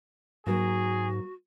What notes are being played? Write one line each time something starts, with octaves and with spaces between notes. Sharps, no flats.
G#2 F#3 A#3 F#4 G#4 A#4